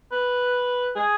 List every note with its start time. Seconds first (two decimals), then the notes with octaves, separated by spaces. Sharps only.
0.12 B4
0.96 G#4